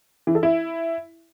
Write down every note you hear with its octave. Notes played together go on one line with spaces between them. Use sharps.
E3
A4
E4